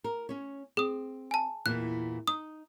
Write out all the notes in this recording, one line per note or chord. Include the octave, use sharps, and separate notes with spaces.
A#4
C#4 C#5
C4 G#4 D#6
G#5 A5
E2 A#2 E3 F#6
D#4 D#6